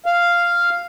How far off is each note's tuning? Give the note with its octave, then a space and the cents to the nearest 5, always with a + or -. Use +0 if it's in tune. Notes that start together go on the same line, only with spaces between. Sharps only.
F5 -5